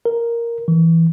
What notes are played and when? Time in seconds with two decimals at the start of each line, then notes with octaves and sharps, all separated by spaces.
0.05 A#4
0.68 E3